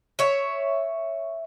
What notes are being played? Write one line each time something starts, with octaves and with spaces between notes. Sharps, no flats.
C#5 E5